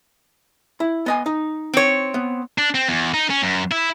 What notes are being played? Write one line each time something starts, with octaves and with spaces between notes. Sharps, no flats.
E4
B3 D#5 G#5
D#4
C4 C#5
B3
D4
C4
E2
D#4
C#4
F#2
E4